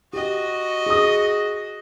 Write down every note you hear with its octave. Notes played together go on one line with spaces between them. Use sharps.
F#4 G4 D#5
G#4 D#6